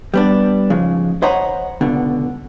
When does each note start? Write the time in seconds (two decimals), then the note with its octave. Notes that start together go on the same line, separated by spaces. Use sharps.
0.14 G3 B3 D4
0.70 G#2 C#3 F3 G#3
1.22 C5 C#5 D#5 F#5 A#5 B5
1.81 C#2 B2 D3